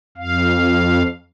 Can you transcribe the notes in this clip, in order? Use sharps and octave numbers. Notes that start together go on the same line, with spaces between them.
F2 F5